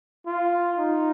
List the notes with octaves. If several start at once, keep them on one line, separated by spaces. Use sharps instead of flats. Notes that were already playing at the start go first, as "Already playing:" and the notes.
F4
D#4